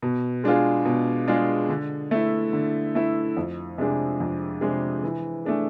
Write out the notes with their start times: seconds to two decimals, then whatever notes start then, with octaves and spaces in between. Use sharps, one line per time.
0.02 B2
0.44 G#3 D4 F4 G#4
0.85 B2
1.28 G#3 D4 F4 G#4
1.69 D3
2.11 A3 E4
2.53 D3
2.95 A3 E4
3.37 F2
3.78 C3 G#3 D4 G#4
4.20 F2
4.61 C3 G#3 D4 G#4
5.03 E3
5.45 A3 D4 G#4